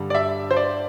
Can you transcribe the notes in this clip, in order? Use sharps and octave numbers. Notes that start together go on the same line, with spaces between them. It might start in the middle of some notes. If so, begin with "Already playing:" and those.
Already playing: G2 D3 G3
D5
E5
C5
D5